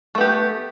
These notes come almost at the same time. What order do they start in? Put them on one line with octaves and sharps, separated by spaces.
A3 B3 G4